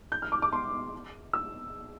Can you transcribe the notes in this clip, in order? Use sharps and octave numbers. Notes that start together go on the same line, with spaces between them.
G6
F6
D6
D6
C6
E6